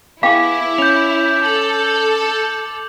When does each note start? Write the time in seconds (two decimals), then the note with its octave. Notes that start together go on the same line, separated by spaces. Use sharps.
0.23 B3 E4 G#4 F5 G5 D6
0.78 C#4 G6 F7
1.46 A4 F#7